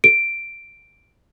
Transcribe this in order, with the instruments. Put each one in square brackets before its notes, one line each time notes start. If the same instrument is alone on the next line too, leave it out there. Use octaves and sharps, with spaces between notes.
[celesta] D7